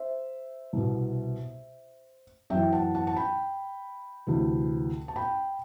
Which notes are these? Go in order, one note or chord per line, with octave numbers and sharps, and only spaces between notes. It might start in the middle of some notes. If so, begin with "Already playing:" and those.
Already playing: C5 E5
C2 B2
F#2 E3 E5 G5
F#5 A5
F#5 A5
A5
G5 B5
D2 C3 E3
A5
G5 B5